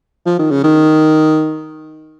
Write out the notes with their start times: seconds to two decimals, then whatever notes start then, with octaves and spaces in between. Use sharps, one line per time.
0.26 F3
0.39 D#3
0.51 C#3
0.63 D#3